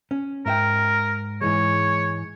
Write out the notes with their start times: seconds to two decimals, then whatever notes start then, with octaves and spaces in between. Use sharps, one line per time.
0.11 C#4
0.46 G#2 A#4 E5 G5
1.41 G#2 E3 G#3 C#5